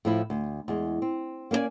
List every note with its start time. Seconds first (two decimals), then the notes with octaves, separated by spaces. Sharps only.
0.05 A2 F3 E4
0.30 D2
0.68 E2 G#3
1.02 C4
1.51 A#3 C#4 A#4 D5 G#5